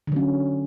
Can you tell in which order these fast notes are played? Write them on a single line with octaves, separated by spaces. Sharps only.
D3 F#3 C#4